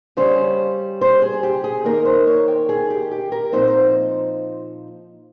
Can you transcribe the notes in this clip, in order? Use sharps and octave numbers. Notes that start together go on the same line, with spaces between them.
C#3 G3 C#4 C5
C5
G#4
G4
G#4
D#3 A#3 D#4 A#4
C5
C#5
G5
G#4
G4
G4
A#4
A#2 F3 C4 D#4 C5
C5